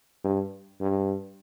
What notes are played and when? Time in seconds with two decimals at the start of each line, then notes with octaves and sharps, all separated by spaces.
0.24 G2
0.81 G2